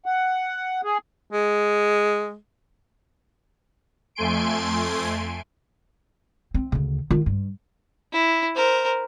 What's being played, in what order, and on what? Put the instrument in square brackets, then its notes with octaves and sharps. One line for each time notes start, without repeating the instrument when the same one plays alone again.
[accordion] F#5
G#4
[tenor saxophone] G#3
[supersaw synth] F2 A3 G#5 C6 D7
[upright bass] C4
D2 C#3
D#3 F4
G2
[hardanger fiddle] E4
A#4 C5